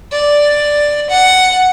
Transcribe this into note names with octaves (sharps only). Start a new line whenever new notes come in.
D5
F#5